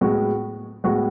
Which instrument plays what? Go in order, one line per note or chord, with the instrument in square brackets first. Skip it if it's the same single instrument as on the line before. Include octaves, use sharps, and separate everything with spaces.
[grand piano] A2 G#3 B3 F#4
A2 G#3 B3 F#4